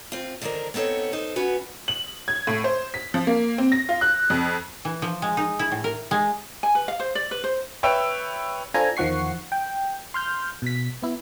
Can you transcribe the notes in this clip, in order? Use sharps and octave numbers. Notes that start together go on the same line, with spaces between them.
C4 F4
D3 D#3 F3 D4 A#4
B3 C4 D#4 A4 C#5
D#4 A4 C5
B3 C#4 F#4 B4
F#7
G#6
A2
C5
B6
F3
A#3
C4
A#6
F4
F#6
F2
E3
F3
G#3
D#4
E4
A2
A#4
G#3
G#5
B4
F5
C5
D5
B4
C5
B4 C#5 E5 G5 E6
D4 F4 A4 C5 G#5 A#5
E2 D#3 F3 F#5 C#6 C7
G5
C6 F6 G6
B2 B6
B3 E4